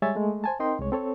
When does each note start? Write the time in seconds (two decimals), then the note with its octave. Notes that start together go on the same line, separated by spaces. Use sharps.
0.02 G3 G#3 C#5 E5 G#5 A6
0.16 G#3 A3
0.44 C5 G#5 A5
0.59 C4 D#4 A#4 D#5 G5 C6
0.79 C2 G#3 C#5
0.92 C4 A4 C#5